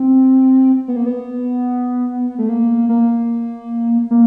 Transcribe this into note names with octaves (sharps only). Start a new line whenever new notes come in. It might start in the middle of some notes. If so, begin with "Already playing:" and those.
Already playing: C4
B3
A#3
B3
A3
A#3
A#3
A#3